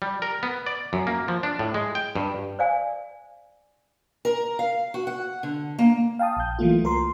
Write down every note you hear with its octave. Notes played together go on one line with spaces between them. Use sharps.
G3
A#4
B3
D5
F#2
A#3
F3
D4
A2
G#3
G5
G2
C5 D5 F5 G#5
A#4
F5
F#4
F#5
D3
A#3
F5 G5 A5 D#6
A#1 G6
E3 F#3 A3 A#3 F4
C2 A#4 C6